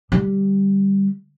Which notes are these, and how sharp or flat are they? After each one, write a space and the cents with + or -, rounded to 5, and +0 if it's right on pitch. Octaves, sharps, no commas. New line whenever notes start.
D3 +15 G3 +0